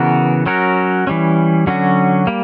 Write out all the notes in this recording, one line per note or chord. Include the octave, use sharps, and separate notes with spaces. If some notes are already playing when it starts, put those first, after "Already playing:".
Already playing: C#3 E3 B3 F#4 A#4
F#3 C#4 F#4 A#4 C#5
E3 G3 C#4
D3 F#3 C#4 F#4
G3 A#3